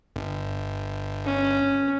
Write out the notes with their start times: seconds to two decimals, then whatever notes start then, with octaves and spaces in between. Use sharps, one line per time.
0.16 G1
1.26 C#4